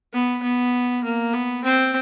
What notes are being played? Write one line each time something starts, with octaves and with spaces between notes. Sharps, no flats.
B3
B3
A#3
B3
C4